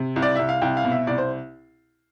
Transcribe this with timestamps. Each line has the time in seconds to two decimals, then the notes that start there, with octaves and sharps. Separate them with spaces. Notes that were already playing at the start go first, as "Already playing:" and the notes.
Already playing: C3
0.16 C2
0.22 D5
0.36 C2 E5
0.49 F5
0.61 C2 G5
0.77 F5
0.84 B2
0.92 E5
1.07 C2 D5
1.18 C5